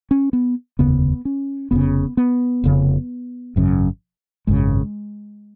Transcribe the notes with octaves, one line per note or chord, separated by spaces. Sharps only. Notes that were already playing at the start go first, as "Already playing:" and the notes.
C#4
B3
F1 D#2 C#3 B3
C#4
F1 F2 C#3 B3
B3
F1 F2 C#3
G#1 F#2 C#3
G#1 F#2 C#3 G#3